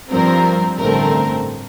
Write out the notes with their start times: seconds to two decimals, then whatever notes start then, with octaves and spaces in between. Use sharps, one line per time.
0.10 G2 F3 C4 A#4
0.78 A1 G2 D3 A3 C4 A#4